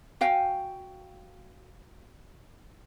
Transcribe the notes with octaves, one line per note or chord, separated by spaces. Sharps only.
F#4 F5 G5 G#5